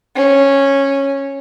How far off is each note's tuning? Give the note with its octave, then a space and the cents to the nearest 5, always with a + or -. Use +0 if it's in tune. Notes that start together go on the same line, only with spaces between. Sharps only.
C#4 -10